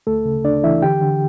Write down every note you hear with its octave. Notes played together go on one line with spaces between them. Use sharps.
D2 A3 A4
C#3
D2 D4 D5
E3 E4 E5
D3 G4 G5
D3